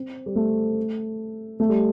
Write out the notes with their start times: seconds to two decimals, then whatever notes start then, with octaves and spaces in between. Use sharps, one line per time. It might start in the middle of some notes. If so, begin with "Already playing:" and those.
Already playing: C4
0.26 G3
0.36 A3
1.60 A3
1.69 G3